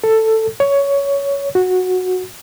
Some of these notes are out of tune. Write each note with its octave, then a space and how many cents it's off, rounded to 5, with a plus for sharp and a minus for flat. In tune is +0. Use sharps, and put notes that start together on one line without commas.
A4 +10
C#5 +15
F#4 -10